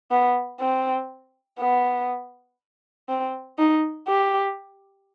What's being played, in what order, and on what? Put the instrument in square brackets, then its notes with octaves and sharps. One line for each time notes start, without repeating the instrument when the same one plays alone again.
[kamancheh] B3
C4
B3
C4
D#4
G4